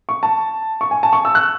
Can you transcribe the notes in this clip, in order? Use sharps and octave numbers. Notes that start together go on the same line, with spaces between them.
C#6
A5
C#6
G#5
A5
C#6
E6
F#6